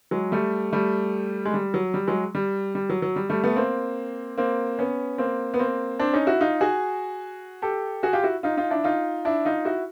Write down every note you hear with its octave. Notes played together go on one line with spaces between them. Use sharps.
F#3 G#3
G3 A3
G3 A3
G#3
G3
F#3
G3
F#3 G#3
G3
G3
F#3
F#3
G3
G3 A3
A3 B3
A#3 C4
A#3 C4
B3 C#4
A#3 C4
B3
A#3 C4
C4 D4
C#4 D#4
E4 F#4
D#4 F4
F#4 G#4
G4 A4
F#4 G#4
F4 G4
E4 F#4
D#4 F4
D#4 F4
D4 E4
D#4 F4
D4 E4
D#4 F4
E4 F#4